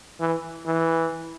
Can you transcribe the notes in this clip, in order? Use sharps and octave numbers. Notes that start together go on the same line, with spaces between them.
E3
E3